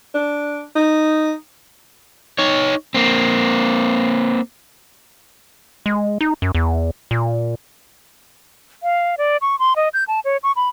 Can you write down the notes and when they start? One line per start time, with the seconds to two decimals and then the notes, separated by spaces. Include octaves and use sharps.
0.15 D4
0.76 D#4
2.38 D#4 C#5
2.94 A#3 C4
5.86 G#3
6.21 D#4
6.42 F#2
6.55 E2
7.11 A#2
8.83 F5
9.18 D5
9.42 C#6
9.59 C6
9.76 D#5
9.94 G6
10.08 A5
10.25 C#5
10.43 C#6
10.56 B5